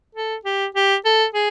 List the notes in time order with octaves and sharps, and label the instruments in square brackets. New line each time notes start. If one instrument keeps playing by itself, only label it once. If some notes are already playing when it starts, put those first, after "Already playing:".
[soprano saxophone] A4
G4
G4
A4
G#4